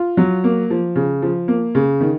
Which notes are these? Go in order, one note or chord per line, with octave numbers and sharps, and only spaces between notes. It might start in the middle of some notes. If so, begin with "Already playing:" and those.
Already playing: F4
F#3
A#3
F3
C#3
F3
A#3
C#3
D#3